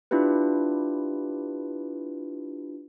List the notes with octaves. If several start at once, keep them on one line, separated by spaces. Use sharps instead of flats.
D4 E4 F4 G4 B4